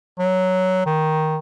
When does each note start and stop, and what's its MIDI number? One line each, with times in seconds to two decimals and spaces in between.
0.19 0.82 54
0.86 1.37 51